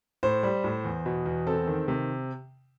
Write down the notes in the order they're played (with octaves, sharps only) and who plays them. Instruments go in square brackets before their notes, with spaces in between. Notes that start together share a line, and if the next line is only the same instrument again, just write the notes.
[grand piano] A2 C5
G3
A2
E2
B2
E2
C4 A4
D#3
C3